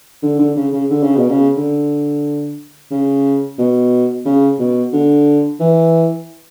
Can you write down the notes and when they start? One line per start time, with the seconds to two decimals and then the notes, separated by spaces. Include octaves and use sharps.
0.23 D3
0.39 D3
0.56 C#3
0.73 C#3
0.90 D3
1.03 C#3
1.17 B2
1.29 C#3
1.57 D3
2.91 C#3
3.58 B2
4.25 C#3
4.59 B2
4.93 D3
5.60 E3